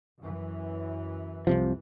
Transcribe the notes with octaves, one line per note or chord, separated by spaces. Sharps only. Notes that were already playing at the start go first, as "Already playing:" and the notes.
F#2 E3
C2 C3 F3